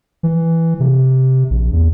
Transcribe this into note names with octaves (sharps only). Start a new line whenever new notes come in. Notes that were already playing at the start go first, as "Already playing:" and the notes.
E3
C3
A#1
E2